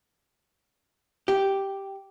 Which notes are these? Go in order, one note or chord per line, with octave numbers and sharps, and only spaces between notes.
G4